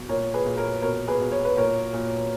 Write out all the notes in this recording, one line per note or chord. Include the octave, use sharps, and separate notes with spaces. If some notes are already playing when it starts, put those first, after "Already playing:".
Already playing: B2
A#2 A#4 C#5
G#4 B4
A#2
A#4 C#5
B2 A#4 C#5
G#4 B4
B2
C#5
B4
A#2 A#4 C#5
A#2